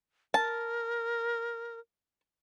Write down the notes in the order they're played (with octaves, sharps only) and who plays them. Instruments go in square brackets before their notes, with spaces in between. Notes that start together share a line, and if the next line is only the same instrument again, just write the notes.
[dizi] A#4 [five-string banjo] A5